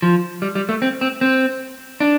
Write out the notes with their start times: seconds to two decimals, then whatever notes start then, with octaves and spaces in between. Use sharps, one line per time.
0.02 F3
0.42 G3
0.55 G3
0.69 A3
0.82 C4
1.01 C4
1.21 C4
2.00 D4